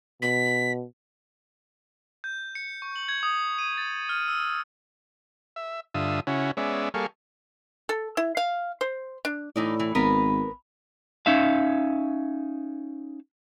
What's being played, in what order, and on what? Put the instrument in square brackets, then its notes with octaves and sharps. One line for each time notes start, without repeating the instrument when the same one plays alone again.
[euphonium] B2 [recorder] B6
[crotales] G6
C#7
C#6
F#7
G#6
D#6
D#7
A6
F6
E6
[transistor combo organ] E5
G2 D3 F4 E5 D#6
C#3 C#4 E4 F#4
G#3 B3 C#4 D5 E5
G3 A#3 G#4 A4 F5 C#6
[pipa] A4
E4
F5
C5
D4
[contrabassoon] A2 [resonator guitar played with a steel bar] E3 D#4 D5
[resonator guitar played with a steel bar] E3
[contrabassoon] G#1 [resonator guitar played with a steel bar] B3 A#4 B4
[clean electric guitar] C#4 D#4 E5 F5